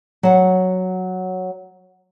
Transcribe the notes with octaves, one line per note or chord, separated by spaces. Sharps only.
F#3 F#5